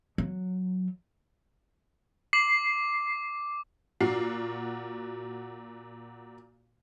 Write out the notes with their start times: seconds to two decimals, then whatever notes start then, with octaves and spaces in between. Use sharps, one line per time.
0.18 F#3
2.33 D6 C7
4.00 A#2 F#4 C7